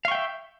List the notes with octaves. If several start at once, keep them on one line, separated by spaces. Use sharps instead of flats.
E5 F5 G5 C#6